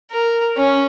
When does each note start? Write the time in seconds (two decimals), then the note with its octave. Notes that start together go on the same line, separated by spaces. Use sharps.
0.12 A#4
0.57 C#4